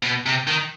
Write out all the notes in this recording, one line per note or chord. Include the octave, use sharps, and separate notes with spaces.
B2
C3
D#3